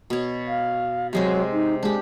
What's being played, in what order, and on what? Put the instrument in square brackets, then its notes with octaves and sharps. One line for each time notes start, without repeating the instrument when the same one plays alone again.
[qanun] B2 C#5
[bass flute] F5
[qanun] C3 G#3 C4 [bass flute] F#3
[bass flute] D#4
[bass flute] G#3 [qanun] D4 G4